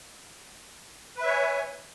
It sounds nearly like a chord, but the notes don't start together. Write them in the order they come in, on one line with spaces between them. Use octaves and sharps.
B4 E5 C#5 G#5